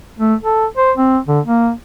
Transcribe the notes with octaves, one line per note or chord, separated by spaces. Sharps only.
A3
A4
C5
C4
D3
A#3